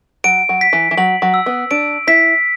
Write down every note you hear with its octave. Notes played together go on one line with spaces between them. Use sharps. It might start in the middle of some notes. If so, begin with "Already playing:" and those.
F#3 D7
F#3
B6
E3
E3
F#3 F#7
F#3
E6
B3
D4 D7
E4 B6